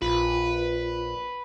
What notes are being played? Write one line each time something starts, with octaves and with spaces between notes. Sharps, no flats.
A#1 F4 B4